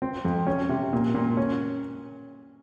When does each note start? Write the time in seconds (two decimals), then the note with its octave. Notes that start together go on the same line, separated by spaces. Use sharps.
0.02 C4
0.25 F2
0.47 C#4
0.69 C3
0.93 A#2
1.15 A#2
1.37 C#4